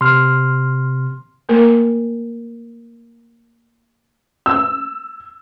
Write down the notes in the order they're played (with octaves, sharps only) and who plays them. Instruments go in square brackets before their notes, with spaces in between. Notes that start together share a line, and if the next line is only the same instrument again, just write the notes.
[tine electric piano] C3 [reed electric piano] C6 F6
[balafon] A3 A#3 A#4
[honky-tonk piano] E6